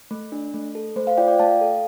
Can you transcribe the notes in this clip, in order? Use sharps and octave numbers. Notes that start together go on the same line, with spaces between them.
A3
D4
A3
A4
A3 C5
C5 F5
F4 D5 G5
D5 G5
A3 F5 A5
A4